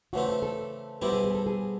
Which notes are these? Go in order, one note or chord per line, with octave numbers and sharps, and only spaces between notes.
C#3 E3 A3 C4 F#4
A4
A4
B2 G3 C4 E4 G4
G#4
G#4
A4
G#4